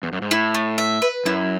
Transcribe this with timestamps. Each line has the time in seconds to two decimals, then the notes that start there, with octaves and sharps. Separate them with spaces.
0.03 E2
0.13 F#2
0.22 G#2
0.31 A2 E4
0.54 A3
0.78 E5
1.02 B4
1.25 F#2 E4